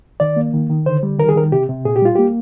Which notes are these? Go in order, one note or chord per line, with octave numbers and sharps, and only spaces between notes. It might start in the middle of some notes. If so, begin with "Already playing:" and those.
D#3 D5
A#3
D#3
D#3
D3 C5
G3
D#3 A#4
G#4
D#3 A#4
C3 G4
C3
A#2 G#4
G4
G3 F4
A#3 G4